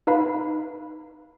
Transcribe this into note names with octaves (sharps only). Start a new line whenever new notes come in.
D#4 B4 F5 B5